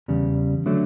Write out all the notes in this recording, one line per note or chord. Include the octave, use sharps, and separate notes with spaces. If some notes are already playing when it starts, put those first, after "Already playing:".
E2 C#3 G3
D3 F#3 A3